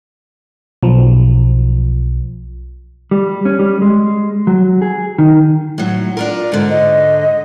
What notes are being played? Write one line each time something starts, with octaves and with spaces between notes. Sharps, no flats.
B1 F3
G3
C#4
G3
G#3
F#3
G#4
D#3
A2 F#3
D4 F4 A#4
G#2 D3
D#5